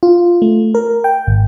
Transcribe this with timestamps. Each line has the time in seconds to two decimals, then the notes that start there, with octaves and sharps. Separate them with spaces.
0.03 F4
0.42 A3
0.75 A#4
1.04 G5
1.27 G#1